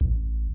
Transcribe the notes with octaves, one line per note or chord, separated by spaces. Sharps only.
A1